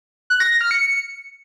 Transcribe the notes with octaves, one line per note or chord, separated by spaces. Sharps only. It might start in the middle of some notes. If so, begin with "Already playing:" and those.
F#6
A#6
A#6
F6
C#7